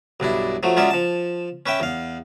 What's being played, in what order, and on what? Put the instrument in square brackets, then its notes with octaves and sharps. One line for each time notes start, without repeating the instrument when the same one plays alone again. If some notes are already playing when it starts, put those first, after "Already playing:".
[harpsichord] B1 G2 D4 E4
F3 F#3 A3
F#3 G#3 C#4 F4 D5 E5
F3 A5
C#4 B4 E5 G5
E2 F5